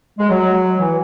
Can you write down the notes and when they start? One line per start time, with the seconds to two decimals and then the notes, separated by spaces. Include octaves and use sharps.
0.19 G#3
0.29 F#3
0.79 E3